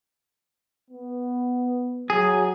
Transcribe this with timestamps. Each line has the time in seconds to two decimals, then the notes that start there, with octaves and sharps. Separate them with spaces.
0.90 B3
2.10 F#3 G#4